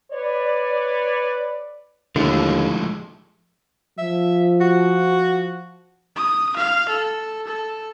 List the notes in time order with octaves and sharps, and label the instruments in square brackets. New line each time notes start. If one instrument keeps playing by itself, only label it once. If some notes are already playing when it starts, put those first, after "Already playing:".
[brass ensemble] B4 C#5 D5
[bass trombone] D#2 [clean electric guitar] D3 [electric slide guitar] F3 G#3 A3 [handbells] E4
[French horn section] F3 [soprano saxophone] E5
[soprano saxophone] F#4
[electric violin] D#6
F5
A4
A4